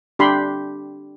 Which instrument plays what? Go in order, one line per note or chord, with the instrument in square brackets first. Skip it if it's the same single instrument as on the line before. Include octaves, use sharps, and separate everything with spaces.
[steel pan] D4 G4 B5 C6